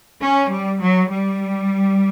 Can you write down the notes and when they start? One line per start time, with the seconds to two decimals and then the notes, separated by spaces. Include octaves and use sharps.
0.21 C#4
0.51 G3
0.81 F#3
1.11 G3